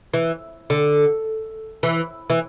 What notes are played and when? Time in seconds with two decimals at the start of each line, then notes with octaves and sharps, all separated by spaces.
0.14 E3
0.70 D3
1.83 E3
2.30 E3